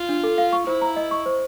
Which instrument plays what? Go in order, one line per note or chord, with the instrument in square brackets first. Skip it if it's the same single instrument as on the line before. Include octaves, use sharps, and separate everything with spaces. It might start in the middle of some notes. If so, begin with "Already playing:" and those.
Already playing: [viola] F4
[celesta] D4
A4
F5
C#6
[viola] E4 [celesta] C5
[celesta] A#5
D#5
C#6
C5